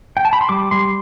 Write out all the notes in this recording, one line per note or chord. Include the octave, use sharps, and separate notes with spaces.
G5
A5
B5
C6
G3 D6
G3 C6